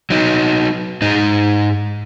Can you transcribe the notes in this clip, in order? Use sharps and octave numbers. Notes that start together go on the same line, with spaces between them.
F#3 D#4
G#2 D#4